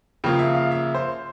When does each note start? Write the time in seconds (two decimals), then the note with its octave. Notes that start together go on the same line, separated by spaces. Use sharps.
0.24 C#3 F3 A#3 F4 G5
0.39 E5
0.55 F5
0.71 E5
0.95 C5